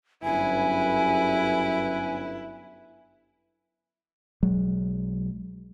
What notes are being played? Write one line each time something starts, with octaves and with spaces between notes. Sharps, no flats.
G1 F#2 E4 B4 G#5
B1 F#3 G#3